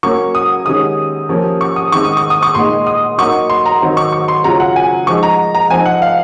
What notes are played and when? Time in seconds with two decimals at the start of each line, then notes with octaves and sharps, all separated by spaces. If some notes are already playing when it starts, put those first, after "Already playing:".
0.03 F#3 A#3 C#4 C#6
0.35 D#6
0.66 C3 D#3 G#3 C#4 D#6
1.29 C3 F3 A#3 C#4
1.61 C#6
1.76 D#6
1.92 D#3 G#3 C4 C#6
2.05 D#6
2.17 C#6
2.30 D#6
2.43 C#6
2.55 A#2 G#3 D#4 C6
2.87 D#6
3.18 F#3 A#3 D#4 C#6
3.50 C6
3.66 A#5
3.82 D#3 F#3 C4 D#4
3.97 C#6
4.13 C#6
4.28 C6
4.44 C#3 F#3 C#4 F4 A#5
4.60 F#5
4.76 G#5
5.07 F3 G#3 D#4 C#6
5.23 A#5
5.55 A#5
5.70 F3 C4 D#4 G#5
5.86 F#5
6.02 F5